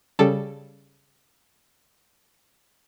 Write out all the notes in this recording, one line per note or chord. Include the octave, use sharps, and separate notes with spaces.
C#3 G3 A4